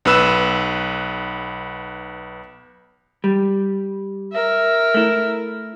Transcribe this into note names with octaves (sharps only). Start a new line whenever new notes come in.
B1 B3 B4 E6 E7
G3
A#4 E5
A3 E4